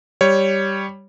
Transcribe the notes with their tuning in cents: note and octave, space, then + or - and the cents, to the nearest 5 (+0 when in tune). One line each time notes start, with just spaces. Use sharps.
G3 +0 C#5 +0